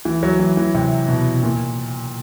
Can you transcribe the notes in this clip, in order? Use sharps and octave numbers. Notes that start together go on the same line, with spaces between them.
E3
F#3
E3
E3
C3
B2
A#2